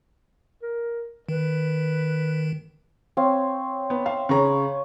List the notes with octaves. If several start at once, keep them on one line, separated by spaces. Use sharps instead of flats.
A#4
D#3 B4
C4 C#5 F5
B3
E5 F5
C#3 B4 C#5 F5 A#5